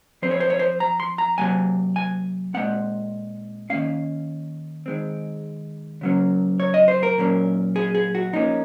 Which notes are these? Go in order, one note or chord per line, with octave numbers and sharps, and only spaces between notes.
F3 C4 C5
C#5
C5
C#5
C5
A#5
C6
A#5
C3 F#3 A#3 G#5
G#5
A#2 G#3 C4 F#5
D#3 A#3 C#4 F5
D#3 G#3 C4
C#3 F#3 A#3 C#4
C#5
D#5
C5
A#4
A#2 F#3 A#3 C#4
G#4
G#4
F#4
F3 A#3 C#4 D#4